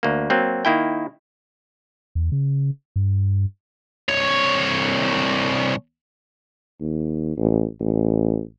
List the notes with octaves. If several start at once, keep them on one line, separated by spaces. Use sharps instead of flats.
D2 A#3
F#3 A#3 C4
D#3 A#3 E4 G5
E2
C#3
G2
C2 C#5
D#2
A1
A1